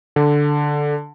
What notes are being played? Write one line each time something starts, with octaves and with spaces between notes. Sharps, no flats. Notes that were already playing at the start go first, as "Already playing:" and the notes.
D3